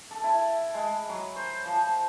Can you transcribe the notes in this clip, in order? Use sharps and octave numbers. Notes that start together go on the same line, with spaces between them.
A4
E4
G#3
F#3
C5
F3